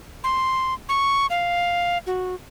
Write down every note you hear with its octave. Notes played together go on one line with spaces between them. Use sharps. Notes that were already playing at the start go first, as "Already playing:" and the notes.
C6
C#6
F5
F#4